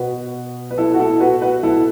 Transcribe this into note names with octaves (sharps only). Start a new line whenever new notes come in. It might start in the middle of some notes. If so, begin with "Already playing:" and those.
Already playing: B2 F#4 B4
B4
E4 A4
F#4
E4 A4
F#4 B4
F#4 B4
E4 A4